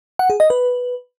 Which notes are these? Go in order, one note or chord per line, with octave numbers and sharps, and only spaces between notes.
F#5
G#4
D#5
B4